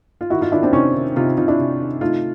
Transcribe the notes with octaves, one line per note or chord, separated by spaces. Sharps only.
F4
D#3 E4 F#4
D#4 F4
D#3 D4 E4
C4 D4
C3 C#4 D#4
D#3
C3 D#4 F4
C3 D#4 F4
D4 E4
C3
D#3
A3 D#4 F4